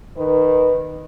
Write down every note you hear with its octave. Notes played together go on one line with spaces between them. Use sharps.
D#3 D#4 B4